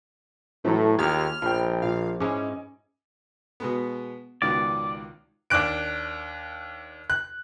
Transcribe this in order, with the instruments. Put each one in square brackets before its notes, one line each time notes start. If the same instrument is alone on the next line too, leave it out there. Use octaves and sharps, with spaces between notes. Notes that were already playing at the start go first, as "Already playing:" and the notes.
[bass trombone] A2 [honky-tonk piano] E3 F#3 A4 [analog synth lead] A3
[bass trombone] D#2 [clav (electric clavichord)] F4 G4 G#4 [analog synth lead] F6 [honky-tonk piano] G#6
[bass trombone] A#1 [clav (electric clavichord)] F3 [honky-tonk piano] G5 B5
[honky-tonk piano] A#2 [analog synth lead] F5
[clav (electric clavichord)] G#2 G#3 E4 [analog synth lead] C#4 [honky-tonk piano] D#5 G#5 D6
[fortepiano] B2 G#3 B3
[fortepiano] C#2 B2 D#3 [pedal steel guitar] D5
[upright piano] D#2 D4 D6 F#6 D7
F#6